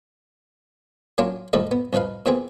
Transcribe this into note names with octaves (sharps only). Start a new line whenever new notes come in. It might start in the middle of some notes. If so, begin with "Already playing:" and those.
F#3 A#3 C#4 D4 F4
D#2 A2 F3 G3 A4 D#5
B3
C2 F3 D#4 B4 F5
A#2 E3 B3 C4 G#4